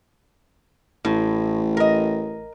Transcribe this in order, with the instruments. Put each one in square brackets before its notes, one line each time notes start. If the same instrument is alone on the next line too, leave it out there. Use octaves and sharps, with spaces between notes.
[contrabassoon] A1 [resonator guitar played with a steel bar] A2
[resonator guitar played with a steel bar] A#4 D#5